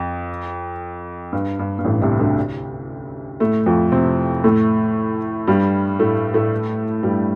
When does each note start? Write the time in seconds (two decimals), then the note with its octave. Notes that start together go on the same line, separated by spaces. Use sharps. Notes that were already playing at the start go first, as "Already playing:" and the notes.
Already playing: F2
1.33 G2
1.59 G2
1.79 G2
1.85 A1 A2
2.02 C2 C3
2.19 D2 D3
3.40 A2 A3
3.66 F2 F3
3.92 C3 C4
4.44 A2 A3
5.47 G2 G3
5.99 A2 A3
6.34 A2 A3
7.03 G2 G3